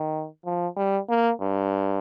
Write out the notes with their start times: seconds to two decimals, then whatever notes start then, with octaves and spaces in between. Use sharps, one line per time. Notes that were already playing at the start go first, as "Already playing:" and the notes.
Already playing: D#3
0.45 F3
0.77 G3
1.09 A#3
1.41 G2